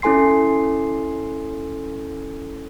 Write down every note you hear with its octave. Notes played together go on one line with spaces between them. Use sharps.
C#4 E4 A4 G#5 C6 C7